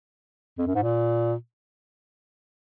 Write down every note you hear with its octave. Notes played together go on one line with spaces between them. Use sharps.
F2
F#2
G#2
A#2